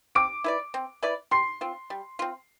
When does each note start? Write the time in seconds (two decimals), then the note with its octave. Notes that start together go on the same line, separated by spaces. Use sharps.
0.15 C4 D6 D7
0.44 E4 B4 D5
0.74 C4
1.03 E4 B4 D5
1.31 G3 C6 C7
1.61 C4 F4
1.90 G3
2.19 C4 F4